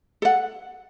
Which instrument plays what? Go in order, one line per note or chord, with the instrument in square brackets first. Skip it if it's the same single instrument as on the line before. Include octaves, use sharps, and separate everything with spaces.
[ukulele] A4 F#5